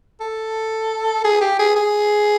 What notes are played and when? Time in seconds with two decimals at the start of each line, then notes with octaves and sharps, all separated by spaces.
0.20 A4
1.24 G#4
1.41 G4
1.59 G#4
1.76 G#4